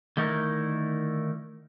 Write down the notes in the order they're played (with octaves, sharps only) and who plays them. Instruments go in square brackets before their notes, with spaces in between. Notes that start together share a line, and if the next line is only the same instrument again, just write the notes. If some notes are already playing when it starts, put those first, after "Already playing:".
[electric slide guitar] D3 D#3 A3 D#4 E4 A#4